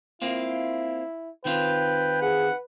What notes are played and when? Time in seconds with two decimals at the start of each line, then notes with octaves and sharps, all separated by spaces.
0.22 A#3 C4 E4 F4
1.45 D#3 C4 F4 B4 G5
2.22 G#4 F#5